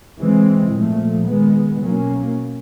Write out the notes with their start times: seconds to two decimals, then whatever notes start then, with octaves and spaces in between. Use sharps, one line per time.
0.18 E3 G#3 C4
0.73 A#2 F3 A3
1.27 D#3 G#3 B3
1.81 B2 F#3 A#3 C#4